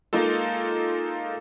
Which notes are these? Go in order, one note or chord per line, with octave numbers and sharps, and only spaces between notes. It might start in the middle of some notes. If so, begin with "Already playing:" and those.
G#3 A#3 D#4 F4 A4